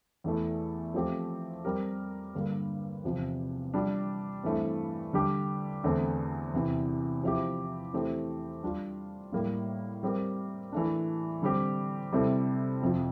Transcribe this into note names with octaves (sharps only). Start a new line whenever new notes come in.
E2 E3 A3
F3 A3 C4 G4
G3 C4 G4 A#4
G2 D3 G3 A#3
E2 C3 F3
G3 D4 F4
G2 E3 A3 C4
D3 G3 D4 G4
E2 D3 A3 C4
E2 C3 E3
F3 C4 E4 G4
E3 A3 C4 G4
G3 D4 F4
A2 G3 A#3
G3 C4 G4 A#4
E3 A3 D4
D3 G3 C4 G4
C3 G3 C4 E4 A4
F2 C3 F3